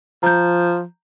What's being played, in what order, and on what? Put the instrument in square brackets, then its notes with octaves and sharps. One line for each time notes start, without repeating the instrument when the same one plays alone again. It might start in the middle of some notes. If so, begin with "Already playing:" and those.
[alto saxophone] F3 [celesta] A#5 G6